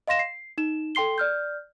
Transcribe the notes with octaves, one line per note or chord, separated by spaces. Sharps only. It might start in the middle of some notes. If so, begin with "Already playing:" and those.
D#5 F5 C6 A#6 E7
C7
D#4 E7
A4 G5 C6 C7 G7
D5 F6 G6